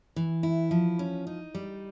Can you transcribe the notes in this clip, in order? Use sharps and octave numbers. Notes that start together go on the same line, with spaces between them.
E3
E4
F3
C#4
D#4
G3